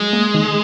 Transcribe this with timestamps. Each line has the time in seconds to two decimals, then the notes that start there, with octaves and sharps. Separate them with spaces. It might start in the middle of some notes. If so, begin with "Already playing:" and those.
Already playing: F#3 G#3
0.13 A#3
0.34 D#3